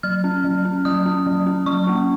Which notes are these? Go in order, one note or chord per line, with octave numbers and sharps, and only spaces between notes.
F#3 F6
C#4
F#3
C#4
F#3 D#6
C#4
F#3
C#4
F#3 C#6
A#3 C#4